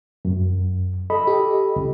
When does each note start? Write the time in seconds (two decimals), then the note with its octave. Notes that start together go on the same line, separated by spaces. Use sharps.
0.25 F#2
1.10 A4 D#5 B5
1.27 G4
1.76 C#2